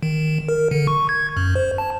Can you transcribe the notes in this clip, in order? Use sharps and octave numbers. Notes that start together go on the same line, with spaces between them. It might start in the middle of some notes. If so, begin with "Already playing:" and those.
D#3
A#4
D3
C#6
G#6
F#2
C5
A5